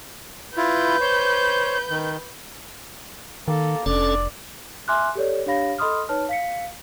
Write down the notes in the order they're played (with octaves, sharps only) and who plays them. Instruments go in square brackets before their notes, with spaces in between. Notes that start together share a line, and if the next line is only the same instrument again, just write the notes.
[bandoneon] E4 F4 [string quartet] B4 G6
[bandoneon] C5 C#5
D#3
[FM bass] D#3 [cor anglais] A#3 [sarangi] A4
[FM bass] F1 [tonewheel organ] C#4 A4 [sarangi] D4 [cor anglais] D5
[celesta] E5 G#5 C6 D6 F6 F#6
G4 A4 C#5 D5
D4 G4 C#5 F5 B5 A#6
A4 D#5 B5 C6 D#6 F6
D#4 B4 C#5 A5 F6
F5 B6 C#7